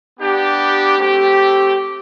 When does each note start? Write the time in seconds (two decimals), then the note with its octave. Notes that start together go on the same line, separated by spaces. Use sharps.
0.20 B3 D4 G4
0.98 A3 C4 G4